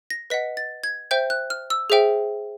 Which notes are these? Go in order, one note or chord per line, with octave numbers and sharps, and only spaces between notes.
A#6
B4 D#5 F#5 B6
A6
G#6
C5 E5 G5 G6
F#6
F6
E6
G#4 C5 E5 G5